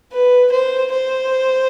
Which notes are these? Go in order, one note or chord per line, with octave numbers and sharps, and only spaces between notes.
B4
C5
C5